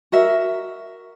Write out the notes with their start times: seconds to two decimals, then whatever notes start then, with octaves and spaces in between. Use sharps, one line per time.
0.12 F#4 A#4 E5